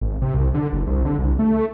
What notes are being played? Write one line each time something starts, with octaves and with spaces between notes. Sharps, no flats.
G#1
C3
C2
D3
F#1
C2
D3
C2
A3